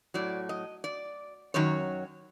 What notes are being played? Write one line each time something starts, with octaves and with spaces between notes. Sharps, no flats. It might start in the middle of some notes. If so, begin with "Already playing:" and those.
A2 F#3 D5
D#5
D5
F#2 D#3 F#3 C#5